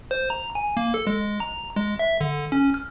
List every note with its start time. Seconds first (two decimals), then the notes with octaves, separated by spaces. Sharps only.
0.11 C5
0.30 A#5
0.55 G#5
0.77 A#3
0.94 A4
1.07 G#3
1.40 A#5
1.76 G#3
1.99 E5
2.21 D3
2.52 C#4
2.74 F6